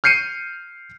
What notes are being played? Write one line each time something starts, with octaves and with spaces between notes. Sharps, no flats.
F6 G6 C7 C#7 D#7